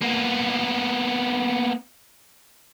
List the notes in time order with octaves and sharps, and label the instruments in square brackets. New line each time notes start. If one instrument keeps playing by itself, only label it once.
[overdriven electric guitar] A#3 B3